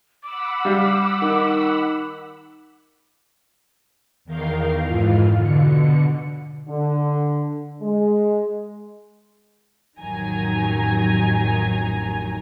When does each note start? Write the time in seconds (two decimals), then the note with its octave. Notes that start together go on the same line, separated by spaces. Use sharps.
0.23 F#5 B5 D6 E6
0.65 G3 F5
1.22 D#3
4.25 E2 D#3 A#4 F5 G6 C7
4.86 F2 G#2 E3 F4 F5
5.35 B2 D3 C#7
6.68 D3
7.81 G#3
9.99 A1 F2 D#3 F#3 G#5 A#5